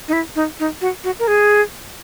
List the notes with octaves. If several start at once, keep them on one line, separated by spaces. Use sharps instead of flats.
D#4
E4
D#4
D#4
F#4
F#4
A#4
G#4